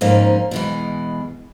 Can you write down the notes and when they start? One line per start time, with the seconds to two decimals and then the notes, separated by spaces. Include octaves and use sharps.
0.01 F2 G#2 B2 A#3 C#4 D#4
0.51 B2 E3 G#3